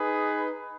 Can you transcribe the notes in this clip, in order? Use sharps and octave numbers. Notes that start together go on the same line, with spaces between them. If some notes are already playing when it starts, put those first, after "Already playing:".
Already playing: D#4 G#4 B4